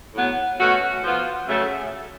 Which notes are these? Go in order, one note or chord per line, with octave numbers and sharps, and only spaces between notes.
A2 F#3 B3
B2 A3 C#4 F#4
F3 B3 F4
C#3 F#3 A3